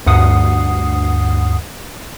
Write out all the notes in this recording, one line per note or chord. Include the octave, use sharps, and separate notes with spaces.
D2 G2 F#5 D#6 C7